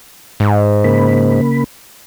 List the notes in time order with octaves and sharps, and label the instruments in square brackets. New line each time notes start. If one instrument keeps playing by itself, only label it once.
[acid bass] G#2
[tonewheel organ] C#3 A#3 B5